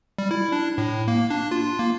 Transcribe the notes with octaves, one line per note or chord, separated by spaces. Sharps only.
G3
E4
D4
A2
A#3
D4
F4
A#3